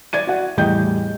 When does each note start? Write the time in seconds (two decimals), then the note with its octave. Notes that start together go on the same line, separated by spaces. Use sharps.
0.13 D5 G#6 D#7
0.27 F#4 F#5
0.57 E2 A2 G3 D#5 G5 G6